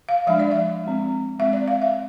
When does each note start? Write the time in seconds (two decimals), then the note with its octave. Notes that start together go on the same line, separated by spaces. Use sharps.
0.09 F5
0.27 F3 G#3 D4 E5
0.39 D5
0.51 E5
0.84 G#3 C4
1.40 G#3 C4 E5
1.53 D5
1.68 F5
1.82 E5